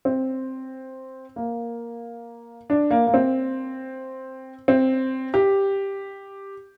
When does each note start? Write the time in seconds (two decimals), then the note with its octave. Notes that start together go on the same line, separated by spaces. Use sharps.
0.05 C4
1.36 A#3
2.70 D4
2.91 A#3
3.07 A#3
3.14 C4
4.68 C4
5.34 G4